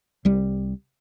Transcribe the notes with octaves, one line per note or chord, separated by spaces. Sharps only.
C2 G3